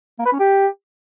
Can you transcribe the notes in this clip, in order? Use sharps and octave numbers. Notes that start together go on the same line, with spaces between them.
A#3
B4
C#4
G4